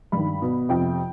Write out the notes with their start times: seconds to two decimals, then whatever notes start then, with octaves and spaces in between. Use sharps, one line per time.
0.12 G2 D#3 B5
0.42 B2
0.69 F2 C3 F3 G5